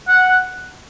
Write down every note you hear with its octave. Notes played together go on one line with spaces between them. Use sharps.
F#5